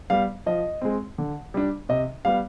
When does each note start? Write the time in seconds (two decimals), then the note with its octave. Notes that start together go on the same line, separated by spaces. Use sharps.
0.10 G3 B3 F5
0.46 F3 D#5
0.82 G#3 C4
1.18 D3
1.54 G3 D4
1.89 C3 D#5
2.25 G3 B3 F5